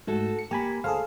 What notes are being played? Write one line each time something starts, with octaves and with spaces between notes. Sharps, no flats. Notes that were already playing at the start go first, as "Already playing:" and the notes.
G#2 A3 F#4 A4
C#7
A#3 G4 G#5 B5
D2 G#4 A4 C5 F5